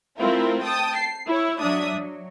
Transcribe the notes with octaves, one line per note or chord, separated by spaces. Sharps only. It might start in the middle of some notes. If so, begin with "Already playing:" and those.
A3 C4 E4 F4 A#4
G5 A5 D#6
C7
E4 C#5
F#3 D4 E5 D#6
F#3